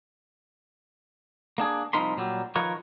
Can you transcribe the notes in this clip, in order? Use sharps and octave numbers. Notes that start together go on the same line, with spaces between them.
A#3 D4 G#4
C2 F3 D#4 A#4 B5 C6
A#2 F#3 G3
D#3 F3 F4 A#4 B4 C#5